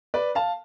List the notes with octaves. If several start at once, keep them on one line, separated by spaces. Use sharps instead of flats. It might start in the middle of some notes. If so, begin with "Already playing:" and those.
B4 D5
F5 A5